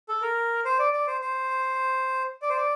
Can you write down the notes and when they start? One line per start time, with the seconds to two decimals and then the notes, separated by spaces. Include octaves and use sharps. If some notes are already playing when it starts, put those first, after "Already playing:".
0.09 A4
0.22 A#4
0.65 C5
0.79 D5
0.93 D5
1.07 C5
1.21 C5
2.42 D5
2.49 C5
2.57 D5